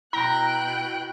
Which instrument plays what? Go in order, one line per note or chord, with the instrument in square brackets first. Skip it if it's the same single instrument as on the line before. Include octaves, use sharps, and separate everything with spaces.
[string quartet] B2 G5 F#6 [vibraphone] E4 [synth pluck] A#5 A#6